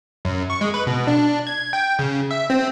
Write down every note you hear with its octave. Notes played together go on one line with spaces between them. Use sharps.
F#2
C#6
G#3
B4
B2
D4
G#6
G5
C#3
E5
C4